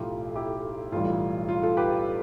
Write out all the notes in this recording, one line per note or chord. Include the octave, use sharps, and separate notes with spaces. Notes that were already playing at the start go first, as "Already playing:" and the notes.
Already playing: B1 A2 F3 A3 E4 F4 G4
E4 G4
B1 A2 E3 G3 F4
F4
F4 A4
G4 B4